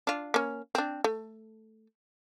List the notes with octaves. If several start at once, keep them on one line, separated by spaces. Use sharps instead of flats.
D4 F4
A#3 C#4
C4 D4
A3